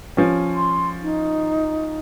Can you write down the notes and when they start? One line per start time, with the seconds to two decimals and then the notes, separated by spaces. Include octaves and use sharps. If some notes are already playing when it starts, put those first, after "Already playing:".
0.17 F3 C#4
0.55 C6
1.02 D#4